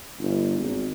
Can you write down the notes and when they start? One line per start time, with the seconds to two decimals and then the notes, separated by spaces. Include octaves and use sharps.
0.19 G1
0.58 G#1